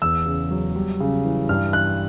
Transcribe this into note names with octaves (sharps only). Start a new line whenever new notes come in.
E2 E6
C#3
F#3
G3
C#3
E3
G2 F6
E3 F#6